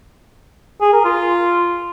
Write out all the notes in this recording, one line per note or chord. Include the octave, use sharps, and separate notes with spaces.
G#4
A#4
F4